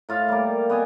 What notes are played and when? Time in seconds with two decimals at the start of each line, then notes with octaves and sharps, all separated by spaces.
0.09 A2 F4 F5
0.28 G3 A#3
0.69 B3 D#5 G#5